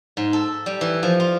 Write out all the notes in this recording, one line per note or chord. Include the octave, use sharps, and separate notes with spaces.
G#2
A4
G3
E3
F3
F4